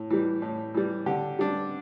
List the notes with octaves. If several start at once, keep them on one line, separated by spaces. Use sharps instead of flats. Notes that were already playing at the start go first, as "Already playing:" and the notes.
Already playing: A2
E3 G3
A2
E3 G3
D3 G4
G3 D4